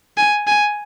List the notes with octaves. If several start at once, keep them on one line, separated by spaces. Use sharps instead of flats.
G#5
G#5